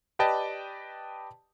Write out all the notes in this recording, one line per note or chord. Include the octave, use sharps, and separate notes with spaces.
G4 B4 D5 D#5 G5 A5